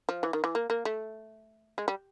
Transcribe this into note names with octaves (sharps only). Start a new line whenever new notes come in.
F3
E3
D#3
E3
A#3
A#3
A3
G#3
G3